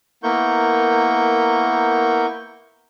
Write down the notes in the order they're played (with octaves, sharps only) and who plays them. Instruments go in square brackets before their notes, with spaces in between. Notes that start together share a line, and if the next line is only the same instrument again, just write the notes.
[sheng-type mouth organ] A#3 B3 E4 A#4 C#6 G6